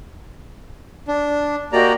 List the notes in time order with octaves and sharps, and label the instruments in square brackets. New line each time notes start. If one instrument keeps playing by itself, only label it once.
[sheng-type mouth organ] D4
[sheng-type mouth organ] A#3 D5 A#5 [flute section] F#4 G4 D#5